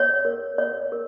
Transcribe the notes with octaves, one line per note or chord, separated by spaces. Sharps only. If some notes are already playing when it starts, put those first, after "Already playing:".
Already playing: C#5
A#4
C#5
A#4